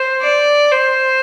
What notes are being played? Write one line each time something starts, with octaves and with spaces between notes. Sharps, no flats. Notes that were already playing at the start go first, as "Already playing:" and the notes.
Already playing: C5
D5
C5